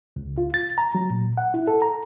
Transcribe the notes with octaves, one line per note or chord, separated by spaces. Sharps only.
C#2
F4
A6
A#5
F#3
A#2
F#5
E4
A4
A#5